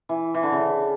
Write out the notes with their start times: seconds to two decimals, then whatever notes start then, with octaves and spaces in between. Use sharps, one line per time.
0.09 E3
0.34 E3
0.43 D3
0.52 C#3